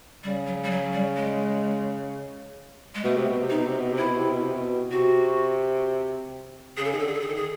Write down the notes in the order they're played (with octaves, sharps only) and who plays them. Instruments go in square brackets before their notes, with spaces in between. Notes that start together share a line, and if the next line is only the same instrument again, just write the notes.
[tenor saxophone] C#3 [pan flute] G3
[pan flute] F#3
G3
F#3
G3
G#3
G#3
[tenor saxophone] B2 [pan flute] A3
[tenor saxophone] C3
B2
C3
[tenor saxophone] B2 [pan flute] D#4
[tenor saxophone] C3
B2
C3
[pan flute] E4
[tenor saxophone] B2
C3
B2
C3
B2
[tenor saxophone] C3 [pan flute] F#4
[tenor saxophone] C#3 [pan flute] G#4
[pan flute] A4
[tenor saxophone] D#3 [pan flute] G#4
[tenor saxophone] D3 [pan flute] A4
[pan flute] G#4
A4
G#4
[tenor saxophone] D#3 [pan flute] A4
[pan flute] G#4